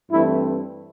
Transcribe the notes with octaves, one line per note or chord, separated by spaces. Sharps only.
G2 E3 A3 C4 E4